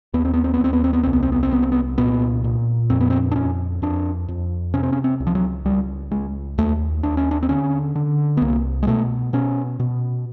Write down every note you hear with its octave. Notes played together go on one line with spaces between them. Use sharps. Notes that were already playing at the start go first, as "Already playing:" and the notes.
D#2 B3
C4
B3
C4
B3
D#2 C4
B3
C4
B3
C2 C4
B3
C4
B3
C4
C2 B3
C4
B3
A#2 B3
A#2
F2 C4
B3
C4
D4
F2 C#4
F2 D4
F2
C3 C#4
C4
C#4
C4
C#2
F3
F#3
C#2 G3
C#2 G#3
D#2 A3
D#2 D4
C#4
D4
C4
D3 C#4
D3
B3
C2 A#3
G#3
B2 A3
B2 C#4
B2